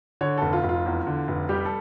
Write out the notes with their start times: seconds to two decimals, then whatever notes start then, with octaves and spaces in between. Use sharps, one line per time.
0.21 D3 C#5
0.38 F1 A4
0.53 F4
0.64 F1
0.69 F4
0.86 E2
1.07 D3
1.28 F1
1.49 G3 G4
1.65 A4